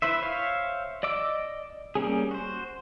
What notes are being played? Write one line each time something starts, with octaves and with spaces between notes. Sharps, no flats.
E4 B4 C5 E5
C5 C#5 E5 F5
D5 D#5 D6 E6
G3 A#3 C#4 G#4
F#4 C5